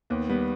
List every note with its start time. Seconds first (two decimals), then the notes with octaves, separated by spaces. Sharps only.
0.10 D#2 B3
0.29 G3 B3